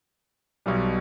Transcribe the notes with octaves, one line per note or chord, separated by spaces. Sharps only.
B1 B2 G3